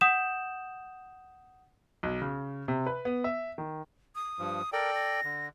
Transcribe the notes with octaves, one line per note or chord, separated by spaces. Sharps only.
F#5 D#6 G6 E7
B1
C#3
C3
B4
B3
E5
D#3
D#6
G2 F3
A4 A#4 D5 G5
A#6
D3